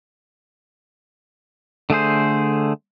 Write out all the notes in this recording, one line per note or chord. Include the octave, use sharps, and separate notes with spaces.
D3 A3 G#4 C5